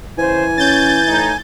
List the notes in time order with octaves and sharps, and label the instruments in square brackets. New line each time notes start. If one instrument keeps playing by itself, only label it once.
[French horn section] C#3 C5 [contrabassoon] E3 [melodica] G#5
[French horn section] C#4 [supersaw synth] G6 A6
[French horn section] A2 D#4